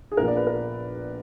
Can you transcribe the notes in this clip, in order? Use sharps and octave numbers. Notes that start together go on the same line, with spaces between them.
G#4
A#1 A#2 F3 B3 A#4
D5
B4
A#4